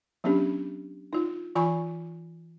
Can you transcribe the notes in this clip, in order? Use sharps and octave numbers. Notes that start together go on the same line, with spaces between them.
F#3 B3 C#4 D4 G4
D#4 F4
E3 F4 G#5 B5 C#6